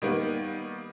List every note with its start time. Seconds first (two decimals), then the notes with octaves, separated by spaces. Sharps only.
0.02 D#3 G3 A#3 B3